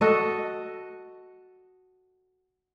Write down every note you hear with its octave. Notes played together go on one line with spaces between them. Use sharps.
F#4 A4 D#5